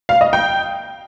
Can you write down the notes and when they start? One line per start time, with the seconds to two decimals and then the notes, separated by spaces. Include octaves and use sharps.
0.09 F5
0.21 D#5
0.33 G5